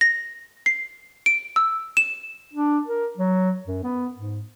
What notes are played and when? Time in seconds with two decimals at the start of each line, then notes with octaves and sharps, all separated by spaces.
0.01 A#6
0.66 C7
1.26 D7
1.56 E6
1.97 E7
2.54 D4
2.87 A#4
3.17 F#3
3.67 F#2
3.84 B3
4.17 G#2